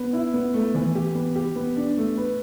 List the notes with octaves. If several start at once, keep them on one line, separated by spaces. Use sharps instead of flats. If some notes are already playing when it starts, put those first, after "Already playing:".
Already playing: B3
E4
B3
A3
E3
G4
B3
G4
B3
D4
A3
B4